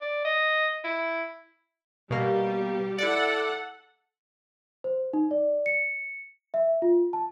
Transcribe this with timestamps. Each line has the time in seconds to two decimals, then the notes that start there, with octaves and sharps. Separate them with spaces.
0.02 D5
0.25 D#5
0.84 E4
2.10 B2 G3 A#3 G4
2.98 E4 A4 D5 F#5
4.84 C5
5.13 D#4
5.31 D5
5.66 C#7
6.54 E5
6.82 F4
7.13 A5